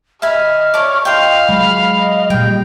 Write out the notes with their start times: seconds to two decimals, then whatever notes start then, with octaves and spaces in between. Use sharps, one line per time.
0.22 D#5 E5 G#5 B5 F6
0.74 C#5 D5 A5 D6
1.05 F4 D#5 F5 G5
1.49 F#3 G#3 B5
1.96 D#5
2.30 A#2 G3 G5